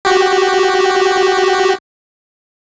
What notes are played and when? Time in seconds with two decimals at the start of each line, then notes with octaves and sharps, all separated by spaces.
0.05 F#4 G4